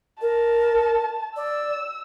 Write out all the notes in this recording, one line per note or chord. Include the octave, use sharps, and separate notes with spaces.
A#4 A5
D5 E6